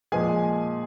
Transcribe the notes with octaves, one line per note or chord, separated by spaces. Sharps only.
A#2 F3 G#3 G#4 G#5